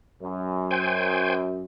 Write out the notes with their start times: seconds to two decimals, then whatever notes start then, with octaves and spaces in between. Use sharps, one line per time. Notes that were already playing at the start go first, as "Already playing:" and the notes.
0.21 F#2
0.71 C5 G5 G#5